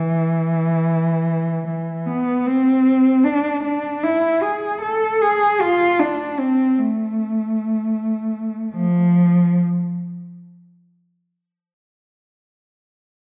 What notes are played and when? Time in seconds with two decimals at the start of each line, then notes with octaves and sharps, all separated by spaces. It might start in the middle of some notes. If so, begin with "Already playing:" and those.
Already playing: E3
1.67 E3
2.06 B3
2.46 C4
3.24 D4
3.64 D4
4.03 E4
4.42 G#4
4.82 A4
5.21 G#4
5.60 F4
6.00 D4
6.39 C4
6.78 A3
8.75 F3